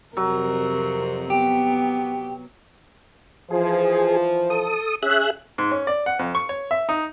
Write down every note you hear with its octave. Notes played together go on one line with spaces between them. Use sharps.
F2 C3 F#3 A#4
B3 G4
E3 F3 G#4
A4 D#6
C#4 G#4 E5 F#6
G#2
C#4
D5
F#5
F2
C#6
C#5
E5
D#4